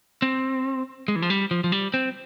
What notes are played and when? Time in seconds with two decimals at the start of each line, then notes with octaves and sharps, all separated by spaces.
0.22 C4
1.08 G#3
1.16 E3
1.22 F3
1.30 G3
1.51 F3
1.64 F3
1.72 G3
1.94 C4